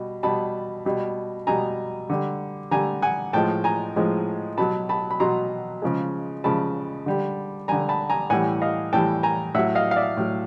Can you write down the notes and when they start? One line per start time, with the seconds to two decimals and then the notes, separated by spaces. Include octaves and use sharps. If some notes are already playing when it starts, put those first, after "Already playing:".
Already playing: B2 G3
0.23 B2 G3 A5 B5
0.85 B2 G3
1.47 B2 G3 G#5 A#5
2.10 D3 G3
2.71 D3 G3 G#5 A#5
3.02 F#5 G#5
3.33 A2 F3 G#3 G5 A5
3.64 G#5 A#5
3.96 A2 F3 G#3
4.58 B2 F#3 A5 B5
4.89 A5 B5
5.11 B5
5.20 B2 F#3 A#5 C6
5.82 C#3 F3 G#3
6.44 C#3 F3 G#3 A5 B5
7.06 D3 G3
7.68 D3 G3 G#5 A#5
7.89 A5 B5
8.10 G#5 A#5
8.30 A2 E3 G3 F#5 G#5
8.62 D#5 F5
8.93 A2 E3 G3 G5 A5
9.23 G#5 A#5
9.54 A2 F#3 E5 F#5
9.75 D#5 F5
9.91 F5
9.96 D5 E5
10.17 A2 F#3